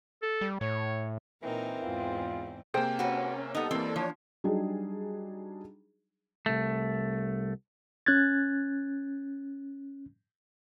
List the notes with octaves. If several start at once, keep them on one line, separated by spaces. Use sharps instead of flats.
A4
G3
A2 C#5
A#2 E3 C4 D#4 A#4
E2 G#2 F4
C3 A#3 G#4 C5 G5
C#4 F#4 B4
G3 B3 D#4 A4
E3 A#3 C4
F3 D4 C#5
F#3 G3 D4 D#4 G#4
C2 A3
C#4 F#6 G#6 A6